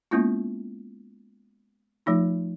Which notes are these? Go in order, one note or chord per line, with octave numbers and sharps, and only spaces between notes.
G#3 A#3 B3 C#4 E4 F4
F3 A3 D#4 F4